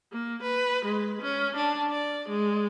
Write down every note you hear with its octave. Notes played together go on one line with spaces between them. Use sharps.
A#3
B4
G#3
C#4
D4
D5
G#3